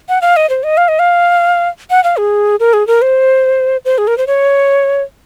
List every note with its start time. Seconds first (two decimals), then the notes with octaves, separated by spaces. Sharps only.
0.09 F#5
0.22 F5
0.36 D#5
0.50 C5
0.63 D#5
0.77 F5
0.88 D#5
0.99 F5
1.90 F#5
2.04 F5
2.18 G#4
2.60 A#4
2.73 G#4
2.87 A#4
3.02 C5
3.85 C5
3.98 G#4
4.07 A#4
4.18 C5
4.27 C#5